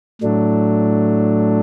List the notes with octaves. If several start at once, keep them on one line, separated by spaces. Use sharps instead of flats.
A2 F#3 A3 D4